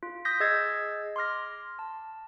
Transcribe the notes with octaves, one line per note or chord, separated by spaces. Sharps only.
F4
D#6 G6 A#6 B6
G#4 D#5 E6 G#6 A6 C7
C6 D6 F6 A#6
A5